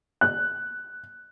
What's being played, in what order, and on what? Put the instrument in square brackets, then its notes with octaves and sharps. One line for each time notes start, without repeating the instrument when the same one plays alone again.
[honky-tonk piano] F#6